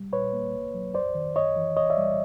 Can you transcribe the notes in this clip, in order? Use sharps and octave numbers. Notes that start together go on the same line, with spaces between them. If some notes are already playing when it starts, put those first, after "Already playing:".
Already playing: G3
A#2 B4 C#5
A#3
C2
F#3
F2 C5 D5
D#3
F#2 C#5 D#5
E3
C2 C#5 D#5
D5 E5
G3